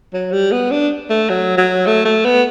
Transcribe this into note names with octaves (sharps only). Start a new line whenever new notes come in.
F#3
G3
B3
D4
A3
F#3
F#3
A3
A3
B3